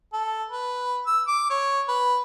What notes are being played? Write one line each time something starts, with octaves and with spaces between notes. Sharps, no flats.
A4
B4
E6
D6
C#5
B4